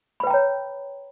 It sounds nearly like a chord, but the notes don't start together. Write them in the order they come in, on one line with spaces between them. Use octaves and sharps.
B5 B4 G5 A#5 C#5